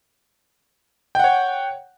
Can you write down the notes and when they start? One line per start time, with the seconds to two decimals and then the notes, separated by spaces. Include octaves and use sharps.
1.15 G5
1.19 F#5
1.24 C#5